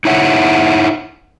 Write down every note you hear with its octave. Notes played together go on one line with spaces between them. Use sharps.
D#4 E4 C#5 E5 F#5